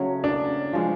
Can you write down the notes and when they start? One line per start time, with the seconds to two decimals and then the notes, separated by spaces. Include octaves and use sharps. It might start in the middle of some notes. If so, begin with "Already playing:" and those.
Already playing: C#3 F#3 A3 C#4
0.24 D4
0.73 F3 G#3 C#4